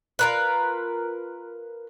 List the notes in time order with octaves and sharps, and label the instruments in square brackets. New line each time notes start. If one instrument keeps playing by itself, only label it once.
[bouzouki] F4 A#4 B4